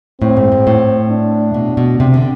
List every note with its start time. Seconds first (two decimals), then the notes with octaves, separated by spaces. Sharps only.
0.21 A2 C4
0.37 G#2
0.52 G#2
0.67 A2
1.11 D4
1.54 B2
1.77 B2
2.00 C3
2.14 D3